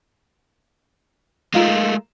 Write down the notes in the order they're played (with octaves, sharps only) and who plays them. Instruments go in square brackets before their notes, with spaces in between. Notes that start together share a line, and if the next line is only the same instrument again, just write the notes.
[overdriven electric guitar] G#3 A3 [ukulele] D#4 F4 A#4